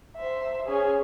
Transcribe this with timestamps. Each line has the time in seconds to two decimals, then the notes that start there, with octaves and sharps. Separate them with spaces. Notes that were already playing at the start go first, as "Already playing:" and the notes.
0.17 C5 E5
0.67 C#4 G#4